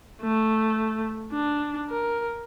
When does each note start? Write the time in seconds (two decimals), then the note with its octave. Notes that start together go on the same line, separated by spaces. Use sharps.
0.22 A3
1.33 D4
1.90 A#4